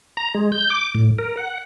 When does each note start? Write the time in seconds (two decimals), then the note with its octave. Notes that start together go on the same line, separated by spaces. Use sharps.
0.17 A#5
0.35 G#3
0.52 G6
0.70 D6
0.95 A2
1.18 A#4
1.37 F#5